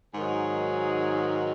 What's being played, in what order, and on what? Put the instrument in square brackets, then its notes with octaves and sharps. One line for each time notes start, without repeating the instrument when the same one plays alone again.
[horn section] G#2 D#3 F#3 G#4